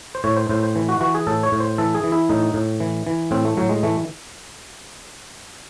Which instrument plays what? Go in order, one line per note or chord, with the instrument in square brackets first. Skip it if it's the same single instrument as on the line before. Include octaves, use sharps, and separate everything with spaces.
[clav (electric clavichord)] C5
A2 C#5
C5
A2 C5
C5
E3
F#4
E3 F#4
G#4
A2 A4
C#5
A2
C5
E3 A4
G#4
E3
E4
A2 D#4
A2
E3
E3
A2 C4
A3
A2 F#3
G#3
E3 A3